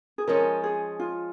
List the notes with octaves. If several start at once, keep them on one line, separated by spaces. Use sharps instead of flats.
G#4
F3 G#3 C#4 A#4
G#4
F4